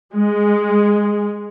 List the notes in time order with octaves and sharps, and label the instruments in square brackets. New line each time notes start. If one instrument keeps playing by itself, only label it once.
[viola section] G#3